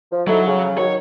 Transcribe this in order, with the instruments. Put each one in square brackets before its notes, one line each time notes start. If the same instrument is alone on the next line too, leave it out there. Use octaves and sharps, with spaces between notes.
[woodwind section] F3
[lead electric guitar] F#3 [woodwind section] D#4 E4 A4
[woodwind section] C#3
[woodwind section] D#3 F#3 [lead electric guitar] C#5